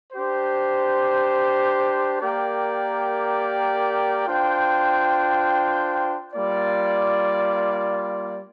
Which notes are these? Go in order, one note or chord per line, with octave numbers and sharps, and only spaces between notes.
D4 G4 C5
A#3 G4 A#4 D5 G5
D4 F4 C5 G5
G3 A#3 F4 D5